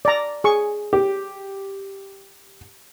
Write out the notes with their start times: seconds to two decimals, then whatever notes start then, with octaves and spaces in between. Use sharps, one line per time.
0.05 D5 A#5
0.44 G#4 C#6
0.93 G4